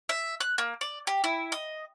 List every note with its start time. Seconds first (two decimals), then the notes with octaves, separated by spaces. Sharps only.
0.09 E5
0.40 F#6
0.58 A#3
0.81 D5
1.07 G4
1.24 E4
1.52 D#5